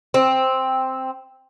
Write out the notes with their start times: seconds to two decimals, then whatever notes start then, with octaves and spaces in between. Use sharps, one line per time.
0.14 C4